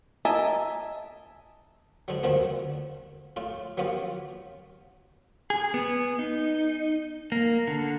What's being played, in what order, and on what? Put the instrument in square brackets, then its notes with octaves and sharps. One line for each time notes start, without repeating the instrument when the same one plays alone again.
[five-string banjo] A#4 D#5 E5 G#5 A5
[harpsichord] G#2 D3 F#3
D2 G2 A#2 D3 B3 C4
A2 F4
F#3 A#3 B3 C#4 F4 G4
[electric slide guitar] G#4
B3
D#4
A#3
D3